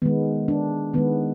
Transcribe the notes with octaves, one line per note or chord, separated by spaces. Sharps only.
D#3 G#3 B3
D4
D#3 G#3 B3